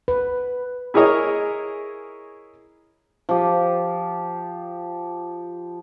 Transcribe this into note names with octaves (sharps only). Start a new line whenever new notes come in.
B4
E4 G#4 A#4 C#5 D#5
F3 G4